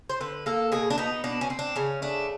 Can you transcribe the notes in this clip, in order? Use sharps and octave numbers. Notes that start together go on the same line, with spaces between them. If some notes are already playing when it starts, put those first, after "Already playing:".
C5
D3 B4
A#3 A4
B2 G#4
D4
B3 D#4
B2 D4
C#4
C4
D4
C#3 C#4
A3 D4